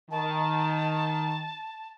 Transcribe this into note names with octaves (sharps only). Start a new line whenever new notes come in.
D#3 A5